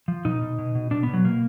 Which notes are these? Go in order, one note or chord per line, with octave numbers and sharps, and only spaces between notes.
F3
B2 D#4
B2
B2
B2
B2 D4
B3
B2 F#3
B2 A#3